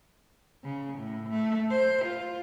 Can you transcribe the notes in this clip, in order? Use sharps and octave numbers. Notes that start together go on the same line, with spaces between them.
C#3
A2
A3
C5
F4